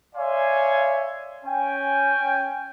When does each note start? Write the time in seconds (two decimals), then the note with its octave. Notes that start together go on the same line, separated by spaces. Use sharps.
0.16 C#5 D5 E5 F5 G#5 C6
1.45 C#4 G5 G#5